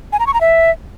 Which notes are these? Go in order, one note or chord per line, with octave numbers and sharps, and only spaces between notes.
G#5
A#5
C#6
A#5
E5